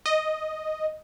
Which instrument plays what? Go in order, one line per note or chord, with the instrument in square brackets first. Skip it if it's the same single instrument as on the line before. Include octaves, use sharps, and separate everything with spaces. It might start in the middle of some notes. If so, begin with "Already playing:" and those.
[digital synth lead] D#5